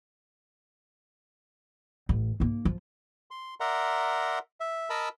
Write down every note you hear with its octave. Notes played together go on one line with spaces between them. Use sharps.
A1
G#2 A#3
F3
C6
A#4 D5 E5 F#5 A#5 C6
E5
A#4 D#5 A5 B5 E6